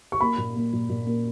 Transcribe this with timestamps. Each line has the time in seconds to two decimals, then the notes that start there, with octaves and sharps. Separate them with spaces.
0.12 C#6
0.21 A#3 B5
0.38 A#2
0.56 A#3
0.73 A#2
0.89 A#2
1.06 A#3